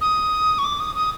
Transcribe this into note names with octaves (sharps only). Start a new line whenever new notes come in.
D#6
C#6
D6
D#6
D#6